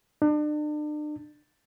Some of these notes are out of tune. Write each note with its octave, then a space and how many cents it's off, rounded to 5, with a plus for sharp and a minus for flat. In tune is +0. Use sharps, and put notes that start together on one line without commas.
D4 +35